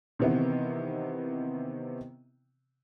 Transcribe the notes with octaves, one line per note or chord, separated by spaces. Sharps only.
C3 D#3 E3 B3 C4 E4